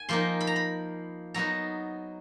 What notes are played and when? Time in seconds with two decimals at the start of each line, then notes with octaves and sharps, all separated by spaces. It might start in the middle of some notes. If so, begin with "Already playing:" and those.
Already playing: G#5
0.09 F3 A#3 D#4 C6
0.41 B5
0.47 A#5
0.56 B5
1.34 F#3 B3 D#4 A#5